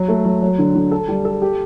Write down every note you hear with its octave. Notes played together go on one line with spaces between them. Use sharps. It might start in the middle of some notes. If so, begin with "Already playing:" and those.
Already playing: F#3
A3
F#3
F#3
D3
D3
A4
G3
A4
G4